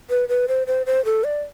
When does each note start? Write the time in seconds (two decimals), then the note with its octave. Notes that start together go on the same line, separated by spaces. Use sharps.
0.10 B4
0.29 B4
0.48 C5
0.67 C5
0.86 C5
1.05 A4
1.24 D5